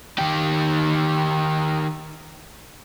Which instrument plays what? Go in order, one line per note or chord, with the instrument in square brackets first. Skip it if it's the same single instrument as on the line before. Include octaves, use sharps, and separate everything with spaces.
[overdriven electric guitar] D#3 G4